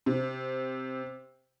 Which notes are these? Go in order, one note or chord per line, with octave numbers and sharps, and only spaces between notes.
C3